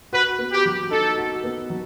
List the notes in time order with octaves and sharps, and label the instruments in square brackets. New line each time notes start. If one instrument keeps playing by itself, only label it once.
[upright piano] F#4 [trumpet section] B4
[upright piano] B3
[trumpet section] G4
[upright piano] F#3
[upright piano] D#4 [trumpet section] A4
[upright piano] F#4
B3
F#3